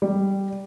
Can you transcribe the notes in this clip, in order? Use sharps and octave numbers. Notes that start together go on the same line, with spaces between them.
G3